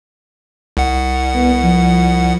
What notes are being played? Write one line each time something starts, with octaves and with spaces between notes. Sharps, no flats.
C2 F#5
B3
F3